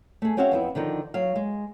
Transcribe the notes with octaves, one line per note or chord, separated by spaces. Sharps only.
A3 G#4
C4 C#4 F#4 G#4 E5 F5
F2 B3 E4
D3 D#3 F3 D#4
F#3 F5
G#3